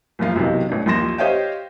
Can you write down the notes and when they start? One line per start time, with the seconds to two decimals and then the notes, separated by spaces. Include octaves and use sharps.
0.19 F#1 A#2 F3 F4
0.36 B1 C3 D#3 E3
0.69 A1 D4
0.86 A#1 D#2 F3 C6 A#6 E7
1.18 G4 C5 C#5 D#5 F5 G5